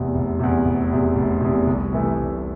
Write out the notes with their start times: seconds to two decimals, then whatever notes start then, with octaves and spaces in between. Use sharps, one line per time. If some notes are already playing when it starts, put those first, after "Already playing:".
Already playing: F1 E2 C3
0.15 F1
0.40 E2 C3
0.65 F1
0.90 E2 C3
1.16 F1
1.41 E2 C3
1.67 C2
1.92 C3 E3 A3
2.17 C2